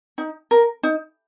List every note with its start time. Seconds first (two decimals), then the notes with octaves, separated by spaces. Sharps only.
0.18 D#4
0.51 A#4
0.83 D#4